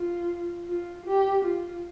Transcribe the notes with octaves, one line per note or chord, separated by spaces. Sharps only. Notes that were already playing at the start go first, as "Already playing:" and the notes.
Already playing: F4
F4
G4
F4